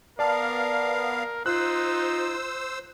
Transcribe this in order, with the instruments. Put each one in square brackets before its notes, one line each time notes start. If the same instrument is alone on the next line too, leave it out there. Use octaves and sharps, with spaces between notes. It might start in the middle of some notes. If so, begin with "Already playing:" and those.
[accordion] B3 F5 [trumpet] A#4 [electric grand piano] D5 A5
[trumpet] D#4 [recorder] F4 [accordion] C5 E6 [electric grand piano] F#6